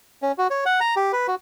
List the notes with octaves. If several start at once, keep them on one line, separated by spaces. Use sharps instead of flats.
C#4
F#4
C#5
F#5
A#5
G4
B4
F#4